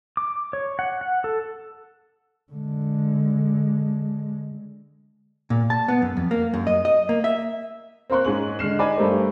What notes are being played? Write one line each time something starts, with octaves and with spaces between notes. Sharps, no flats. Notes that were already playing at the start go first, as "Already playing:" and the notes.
D6
C#5
F#5
F#5
A4
D3 G#3
A#2
A5
B3
F#2
F2
A#3
F#2
D#5
D#5
A#3
E5
C4 A#4 F5 C6 C#6 F#6
G#2 C#4 G#4 C#6 F#7
D3 G#3 F6 C7 E7
D#4 D5 G#5 B5 D6
G2 A3 G4 A#4 C5